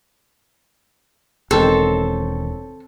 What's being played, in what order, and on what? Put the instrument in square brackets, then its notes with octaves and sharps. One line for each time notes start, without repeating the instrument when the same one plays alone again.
[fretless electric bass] E1 D#3 [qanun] C4 C5 C#5 [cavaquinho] A4